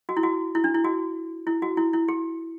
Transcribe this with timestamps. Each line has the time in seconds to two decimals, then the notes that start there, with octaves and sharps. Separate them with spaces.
0.09 F#4
0.17 E4
0.23 F#4
0.55 E4
0.64 D4
0.75 E4
0.85 F#4
1.47 E4
1.62 F#4
1.77 E4
1.93 E4
2.08 G4